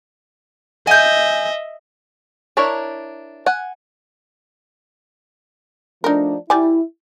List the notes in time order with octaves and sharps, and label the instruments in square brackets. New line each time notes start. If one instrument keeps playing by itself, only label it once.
[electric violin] D#5 E5 [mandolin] G#5 G6
[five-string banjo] D4 E4 A#4 C#5
F#5 G#5
[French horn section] F3 A3 D4 [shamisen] D#4 A#4
[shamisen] G3 D5 G#5 [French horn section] E4